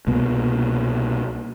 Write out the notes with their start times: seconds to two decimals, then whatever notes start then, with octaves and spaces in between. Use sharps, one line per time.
0.07 C2 B2 A#3 B3